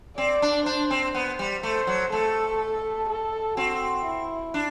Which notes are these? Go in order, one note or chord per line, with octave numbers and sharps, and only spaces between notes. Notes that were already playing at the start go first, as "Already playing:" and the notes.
C4 D5
D4
D4 C5
C4
B3 C5
G3
A3 C5
F#3
A3 A4
A4
C4 F#4
E4
D4